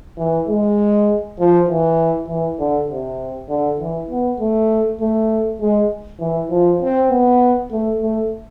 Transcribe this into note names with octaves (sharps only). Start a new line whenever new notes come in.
E3
G#3
F3
E3
E3
D3
C3
D3
E3
B3
A3
A3
G#3
E3
F3
C4
B3
A3
A3